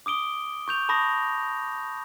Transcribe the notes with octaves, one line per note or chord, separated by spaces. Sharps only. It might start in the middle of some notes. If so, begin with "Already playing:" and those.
D6 D#6 D7 G7
C#6 G6 F7
A5 B5 C#6 D#6 A#6